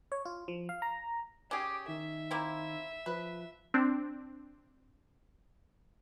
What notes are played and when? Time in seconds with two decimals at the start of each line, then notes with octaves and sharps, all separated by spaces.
0.12 C#5
0.25 F4
0.48 F3
0.69 F5
0.82 A#5
1.51 C#4 G4 G#4 D6
1.88 D#3 E5
2.31 A#3 C4 E4
3.06 F3 B4
3.74 C4 D4